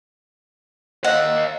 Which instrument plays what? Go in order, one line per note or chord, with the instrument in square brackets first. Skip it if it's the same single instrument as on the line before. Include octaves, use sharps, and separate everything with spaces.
[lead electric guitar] D#5 F5 [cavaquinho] F#5